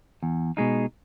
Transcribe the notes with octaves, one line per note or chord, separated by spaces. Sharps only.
E2
B2 G#3 D#4